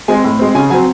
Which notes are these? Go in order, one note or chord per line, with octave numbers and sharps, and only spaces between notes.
G#3 C4 G#5
A2
G#3 C4
C#3 G#5
F#3 C4 G#5